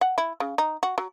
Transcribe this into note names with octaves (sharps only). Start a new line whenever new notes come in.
F#5
E4
C#3
D#4
F#4
F#3